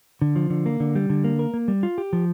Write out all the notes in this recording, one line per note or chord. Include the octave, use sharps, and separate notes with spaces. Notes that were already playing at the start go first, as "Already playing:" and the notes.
D3
F3
D3
A#3
D3
G3
D3
A#3
A#4
A#3
G3
F4
G4
F3